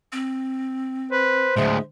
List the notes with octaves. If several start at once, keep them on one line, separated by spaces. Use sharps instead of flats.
C4
B4 C5
D2 A2 G#3 E5